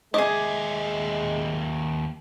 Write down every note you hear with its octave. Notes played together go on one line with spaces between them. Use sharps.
D#2 G#3 G#4 D#5 E5 D6